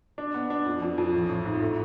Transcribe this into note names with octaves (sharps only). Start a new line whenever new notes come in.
D4
B3
D4
F2
F2
F2
A1
A1
G#2
A3